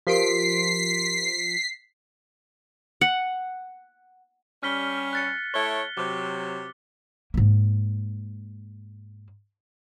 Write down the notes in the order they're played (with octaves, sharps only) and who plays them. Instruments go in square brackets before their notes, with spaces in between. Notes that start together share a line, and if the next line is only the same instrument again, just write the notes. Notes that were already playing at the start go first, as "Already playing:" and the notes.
[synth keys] F3 C6 D7 [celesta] G4 A#4 [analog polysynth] B6 C7
[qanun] F#5
[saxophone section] G3 C#4 [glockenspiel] F6 B6 G7
[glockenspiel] F#6 A6 C#7
[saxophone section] A3 E4 C#5 [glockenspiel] G7
[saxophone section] C3 F#3 [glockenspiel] D6
[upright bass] G#2 A#3